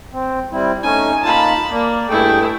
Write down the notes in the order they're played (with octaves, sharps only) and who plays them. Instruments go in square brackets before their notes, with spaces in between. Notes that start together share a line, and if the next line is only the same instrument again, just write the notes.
[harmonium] C4
G3 C4 E4
[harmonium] A3 C#4 D#4 [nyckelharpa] G#5
[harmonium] A#3 D#4 F4 [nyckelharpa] A5 B5
[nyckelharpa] A#3 [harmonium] D5
[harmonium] G2 G#4 G5 [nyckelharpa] A3 E4